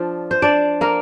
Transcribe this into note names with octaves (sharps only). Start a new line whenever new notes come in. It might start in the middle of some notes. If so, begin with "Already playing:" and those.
Already playing: F3 D4 F4
C5
D4 D5
A#3 A#4